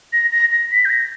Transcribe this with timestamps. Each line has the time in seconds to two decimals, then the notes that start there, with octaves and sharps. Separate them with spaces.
0.13 A#6
0.32 A#6
0.52 A#6
0.71 B6
0.85 G6
0.90 A#6